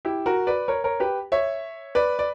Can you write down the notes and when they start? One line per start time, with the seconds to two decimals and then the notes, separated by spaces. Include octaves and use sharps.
0.05 E4 G4
0.26 F#4 A#4
0.47 B4 D5
0.68 A#4 C#5
0.84 A#4 C#5
1.00 G4 B4
1.32 C#5 E5
1.95 B4 D5
2.19 D5